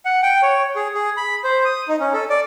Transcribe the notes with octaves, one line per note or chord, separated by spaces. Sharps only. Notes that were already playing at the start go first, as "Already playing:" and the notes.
F#5
G5
C#5
G#4
G#4
B5
C5
D#6
D#4
C#4
A4
D5